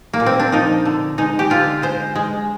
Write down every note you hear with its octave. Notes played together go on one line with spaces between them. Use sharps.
A#3
A#2
C4
D4
F3 D#4
D3
G#3 D#4
G4
D3 F4
G#3 C5
G#3